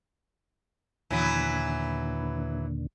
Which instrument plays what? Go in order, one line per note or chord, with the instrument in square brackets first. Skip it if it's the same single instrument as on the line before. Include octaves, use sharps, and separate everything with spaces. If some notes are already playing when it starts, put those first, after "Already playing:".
[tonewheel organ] D#2 A#2 D3 [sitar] E3 F#3 B3